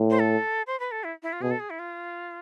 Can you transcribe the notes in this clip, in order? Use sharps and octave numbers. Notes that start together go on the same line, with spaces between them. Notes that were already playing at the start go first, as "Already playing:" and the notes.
Already playing: A2
C5
A4
C5
B4
A4
E4
E4
F4
B2 G#4
A4
G#4
E4
F4